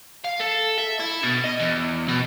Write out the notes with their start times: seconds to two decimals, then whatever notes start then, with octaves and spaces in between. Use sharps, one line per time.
0.24 F5
0.40 A4
0.78 E5
1.00 E4
1.23 B2
1.44 D#5
1.60 E2
2.08 B2